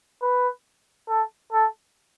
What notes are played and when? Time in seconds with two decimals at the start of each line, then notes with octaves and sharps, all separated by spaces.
0.22 B4
1.09 A4
1.52 A4